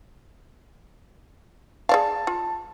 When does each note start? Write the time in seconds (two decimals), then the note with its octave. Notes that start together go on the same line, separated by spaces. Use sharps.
1.89 G#4 D5 F5 A5
2.27 F4